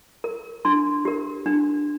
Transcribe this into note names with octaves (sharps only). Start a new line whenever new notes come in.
A#4
D4 C6
G4 A#4
D4